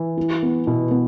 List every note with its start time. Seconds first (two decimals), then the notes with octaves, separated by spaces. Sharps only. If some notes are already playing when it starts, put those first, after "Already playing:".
Already playing: E3
0.17 E4
0.43 B3
0.67 B2 E4
0.91 B3